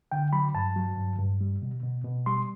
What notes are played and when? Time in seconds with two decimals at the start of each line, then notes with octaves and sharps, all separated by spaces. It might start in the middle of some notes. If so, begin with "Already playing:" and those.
0.12 D3 G5
0.33 F#3 B5
0.55 G2 A5
0.76 F#3
0.98 G2
1.19 G2
1.41 G3
1.62 B2
1.83 B2
2.04 B2
2.26 G3 C6